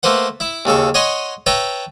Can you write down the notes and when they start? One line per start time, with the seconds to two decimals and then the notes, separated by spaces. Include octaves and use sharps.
0.03 A3 A#3 B4 C5 F#5
0.40 E4 E5
0.65 D#2 C#3 A4 C#6
0.94 C#5 D#5 F#5 G#5 C6 C#6
1.46 B4 C#5 E5 G5 A5 A#5